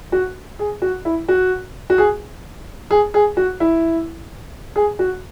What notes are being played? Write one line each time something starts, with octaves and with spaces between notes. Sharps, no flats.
F#4
G#4
F#4
E4
F#4
F#4
G#4
G#4
G#4
F#4
E4
G#4
F#4